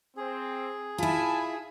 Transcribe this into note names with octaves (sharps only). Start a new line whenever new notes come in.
C4 G#4
E4 F4 G#5 A5 B5